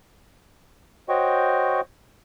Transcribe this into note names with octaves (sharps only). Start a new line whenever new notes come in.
F#4 C5 C#5 D#5 G5 C#6